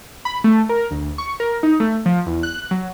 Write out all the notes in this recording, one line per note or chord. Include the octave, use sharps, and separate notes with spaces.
B5
A3
A#4
D2
C#6
A#4
D#4
A3
F3
E2
F#6
F#3